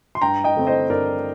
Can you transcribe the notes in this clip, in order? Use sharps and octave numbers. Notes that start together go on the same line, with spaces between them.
C6
G2 G5 A#5
D#5 G5
D3 A3 C4
C5 D#5
G2 A#4 D5